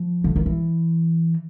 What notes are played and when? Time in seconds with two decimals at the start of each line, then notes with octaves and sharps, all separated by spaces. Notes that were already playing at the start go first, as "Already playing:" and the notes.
Already playing: F3
0.24 D3
0.36 D#3
0.46 E3